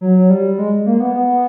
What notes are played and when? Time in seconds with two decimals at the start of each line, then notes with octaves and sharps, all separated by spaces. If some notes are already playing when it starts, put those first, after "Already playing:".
0.01 F#3
0.18 F#3
0.30 G3
0.58 G#3
0.86 A#3
1.00 B3
1.15 B3